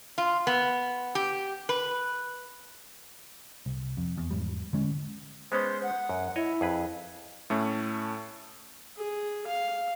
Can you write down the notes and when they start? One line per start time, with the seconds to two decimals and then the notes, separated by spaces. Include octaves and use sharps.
0.18 F4
0.47 B3
1.15 G4
1.69 B4
3.66 C2
3.97 F2
4.18 E2
4.31 E2 G#2 G3
4.73 D3 G#3 C#4
5.52 G#3 B3 C#4 C5
5.83 F#5
6.09 F#2
6.36 E4 C#5 D#5
6.61 F2 G#4 B4
7.50 A2 A3 C#4
8.97 G#4
9.47 F5